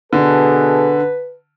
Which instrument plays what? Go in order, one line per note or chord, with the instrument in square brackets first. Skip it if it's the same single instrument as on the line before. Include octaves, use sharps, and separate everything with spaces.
[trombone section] B2 G#4 A4 [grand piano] D3 [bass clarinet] B4